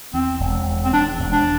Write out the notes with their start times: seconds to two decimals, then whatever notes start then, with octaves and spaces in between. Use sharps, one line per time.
0.14 E2 C4
0.40 E1
0.67 E2
0.84 C4
0.93 E2 D4
1.20 E1
1.33 D4